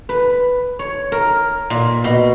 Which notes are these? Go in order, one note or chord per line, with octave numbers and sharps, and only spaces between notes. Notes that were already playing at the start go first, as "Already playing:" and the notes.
B4
C#5
A#4
A#2
B2